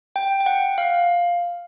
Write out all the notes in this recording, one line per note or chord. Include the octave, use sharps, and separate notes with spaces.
G5
G5
F#5
F5